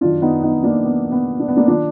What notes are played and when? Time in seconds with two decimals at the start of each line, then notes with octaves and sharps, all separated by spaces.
0.01 F#2 D#3 D4 F4
0.22 B3 D#4
0.43 B3 D#4
0.63 A#3 D4
0.85 B3
1.12 B3
1.40 D4
1.48 B3
1.57 A#3 D4
1.68 D#3 D4 F4